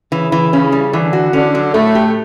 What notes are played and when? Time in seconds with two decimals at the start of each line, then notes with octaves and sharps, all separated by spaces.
0.12 C#3 E3
0.32 E3
0.53 C#3 C#4
0.72 G3
0.93 D3 E3
1.13 F#4
1.33 D3 C#4
1.55 F#3
1.74 A2 A3
1.95 G4